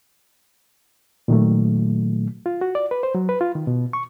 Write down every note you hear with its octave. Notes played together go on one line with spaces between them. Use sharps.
A#2 D#3 F#3 A3
F4
F#4
D5
B4
C5
F#3
B4
F4
D#3
B2
C#6